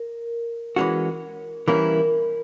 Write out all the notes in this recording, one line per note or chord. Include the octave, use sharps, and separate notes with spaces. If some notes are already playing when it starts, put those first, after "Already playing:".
Already playing: A#4
E3 G#3 C#4 F#4
E3 G3 A#3 C#4 E4 A#4